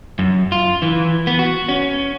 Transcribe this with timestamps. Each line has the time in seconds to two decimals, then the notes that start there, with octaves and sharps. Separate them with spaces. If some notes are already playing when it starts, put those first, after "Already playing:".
0.19 F#2
0.52 F4
0.82 E3
1.27 B3
1.39 F#4
1.69 C#4